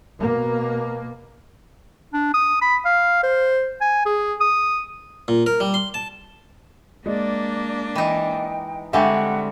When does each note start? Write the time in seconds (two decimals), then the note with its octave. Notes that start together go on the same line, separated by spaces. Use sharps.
0.20 B2 A#3
2.13 D4
2.34 D#6
2.62 B5
2.85 F5
3.23 C5
3.81 G#5
4.06 G#4
4.41 D#6
5.28 A#2
5.46 A#4
5.60 G3
5.74 C6
5.94 A5
7.06 G#3 A#3 D4 D5
7.96 E3 D#4 G5
8.93 D3 G3 G#3 C4 E5 F#5 G#5 C#6